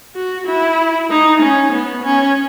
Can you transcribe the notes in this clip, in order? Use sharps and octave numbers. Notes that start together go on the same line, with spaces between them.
F#4
E4
D#4
C#4
B3
C#4